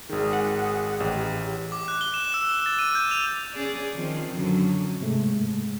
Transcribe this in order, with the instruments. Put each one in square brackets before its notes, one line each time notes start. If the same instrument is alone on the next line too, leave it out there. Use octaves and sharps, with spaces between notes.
[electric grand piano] G#1 D#3 [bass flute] G#4
[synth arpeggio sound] F#5
[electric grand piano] A1 [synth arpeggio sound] G4
[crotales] D6
F#6
G7
E7
E6
E7
A6
D#7
G6
F7
[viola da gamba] C#4 G#4 D5
D#3 F3 C4
F#2 D3 F#3
[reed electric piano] G#2 C3 G#3 A3